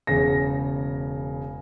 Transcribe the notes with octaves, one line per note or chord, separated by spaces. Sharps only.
E1 C#3 A#6